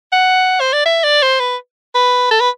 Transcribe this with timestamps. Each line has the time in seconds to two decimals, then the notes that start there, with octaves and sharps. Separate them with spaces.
0.12 F#5
0.61 C5
0.73 D5
0.86 E5
1.04 D5
1.22 C5
1.40 B4
1.95 B4
2.31 A4
2.41 B4